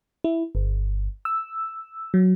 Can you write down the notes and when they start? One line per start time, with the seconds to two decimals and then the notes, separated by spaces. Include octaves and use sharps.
0.24 E4
0.55 G1
1.25 E6
2.14 F#3